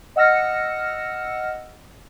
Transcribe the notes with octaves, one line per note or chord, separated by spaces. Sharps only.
D#5 F#5 E6 F6 A#6 C#7